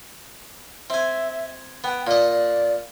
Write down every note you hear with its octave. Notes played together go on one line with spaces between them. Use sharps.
C4 E5 G#5
B3 G5
A#2 D5 D#5
D5